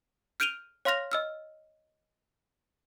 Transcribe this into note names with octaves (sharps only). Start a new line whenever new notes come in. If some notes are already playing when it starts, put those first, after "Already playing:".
F6 G6 D7 D#7 F7 G7
C#5 F5 C6 F6 A#6 F7
D#5 E6 F6